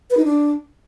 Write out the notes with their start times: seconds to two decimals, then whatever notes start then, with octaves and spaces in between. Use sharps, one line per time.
0.10 B4
0.17 D#4
0.24 D4